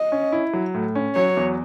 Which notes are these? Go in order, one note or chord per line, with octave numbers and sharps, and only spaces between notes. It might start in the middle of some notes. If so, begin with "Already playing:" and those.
Already playing: D#5
C#4
E4
F#3
A2
C#4
F#3 C#5
E2